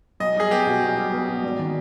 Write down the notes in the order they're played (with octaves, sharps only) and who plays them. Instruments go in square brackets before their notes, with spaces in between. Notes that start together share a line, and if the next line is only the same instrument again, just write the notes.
[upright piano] B1 [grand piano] D#5
[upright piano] G3 [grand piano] G#4
[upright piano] B3 [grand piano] G4
[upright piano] B2
B1
G3
B3
B2
G#1
D#3